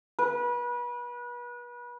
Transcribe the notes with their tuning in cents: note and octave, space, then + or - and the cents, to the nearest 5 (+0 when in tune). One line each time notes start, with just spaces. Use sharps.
B4 -30